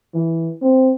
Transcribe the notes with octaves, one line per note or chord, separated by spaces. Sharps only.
E3
C4